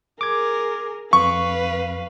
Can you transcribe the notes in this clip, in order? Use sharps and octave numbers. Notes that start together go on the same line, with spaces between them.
G#4 A#4 D6 G#6
F2 B4 F5 C#6